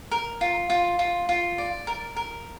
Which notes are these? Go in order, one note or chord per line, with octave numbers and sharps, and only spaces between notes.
A#4
F4
F4
F4
F4
D5
A#4
A#4